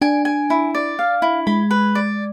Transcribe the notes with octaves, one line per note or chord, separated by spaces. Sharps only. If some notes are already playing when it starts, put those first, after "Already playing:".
D4 G#5
G#5
E4
D5
F5
E4
G#3 B5
B4
D5